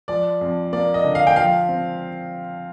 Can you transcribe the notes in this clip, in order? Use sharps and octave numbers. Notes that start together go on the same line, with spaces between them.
F3 D5
F2
A#3 D5
D#5
D3
F5
G5
F3 F5
C4